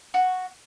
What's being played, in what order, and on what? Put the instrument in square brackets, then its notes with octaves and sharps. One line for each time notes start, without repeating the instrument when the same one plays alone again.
[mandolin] F#4